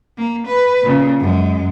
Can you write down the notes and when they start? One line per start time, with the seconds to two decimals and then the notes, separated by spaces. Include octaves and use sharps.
0.18 A#3
0.48 B4
0.83 A#2 C#3
1.20 F#2 G#3